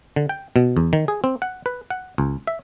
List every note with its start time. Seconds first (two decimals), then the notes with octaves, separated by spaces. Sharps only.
0.16 D3
0.29 G5
0.56 B2
0.77 E2
0.93 D#3
1.08 G#4
1.24 C4
1.42 F#5
1.66 B4
1.90 F#5
2.18 C#2
2.47 E5